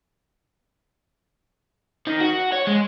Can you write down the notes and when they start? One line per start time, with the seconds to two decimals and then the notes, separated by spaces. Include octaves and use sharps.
2.07 D#3
2.20 F#4
2.52 C#5
2.67 G#3